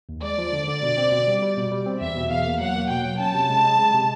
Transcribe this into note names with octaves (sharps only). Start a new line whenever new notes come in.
D#2
G#3 D5
F3
D3
D3
B2
C4
B2
G3
G3
B2
G3
C4
E2 E5
B2
E2 F5
A#3
F#3 F#5
A#3
B2 G5
F#3
C#4 A5
C3
G#3
G#3
G#3
C3